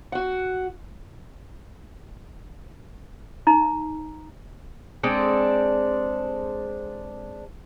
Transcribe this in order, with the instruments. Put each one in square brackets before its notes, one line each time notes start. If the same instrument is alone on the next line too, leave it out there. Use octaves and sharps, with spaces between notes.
[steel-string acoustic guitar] F#4 F#5
[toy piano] D#4 A#5
[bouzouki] G#3 C4 D4 A4